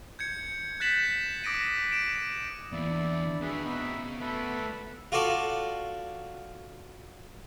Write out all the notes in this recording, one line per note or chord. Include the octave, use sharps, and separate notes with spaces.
G6 G#6 C#7
F#6 G6 A6 B6 E7 F#7
D6 D#6 A#6 D7 D#7
D7 E7
E2 A#3 E4 D5
D4
C4 F#4 G#4 B4 E5
B3 D#4 E5 B5
C#3
A3 F#4 A4 B4 E5
F4 F#4 A4 D5 F5